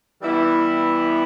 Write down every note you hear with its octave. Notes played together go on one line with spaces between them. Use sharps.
E3 G3 B3 E4